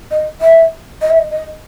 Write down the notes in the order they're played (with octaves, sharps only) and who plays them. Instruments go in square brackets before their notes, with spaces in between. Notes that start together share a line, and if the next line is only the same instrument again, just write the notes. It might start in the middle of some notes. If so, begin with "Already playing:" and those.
[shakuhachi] D#5
E5
D#5
E5
D#5
D#5